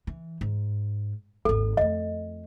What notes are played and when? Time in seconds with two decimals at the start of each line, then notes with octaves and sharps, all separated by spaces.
0.07 E3
0.41 G#2
1.45 G#1 D#2 A4
1.77 F2 A3 D#5